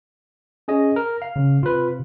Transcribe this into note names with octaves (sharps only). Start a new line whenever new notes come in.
C#4 G#4 D#5
A#4
F5
C#3
C3 F4 B4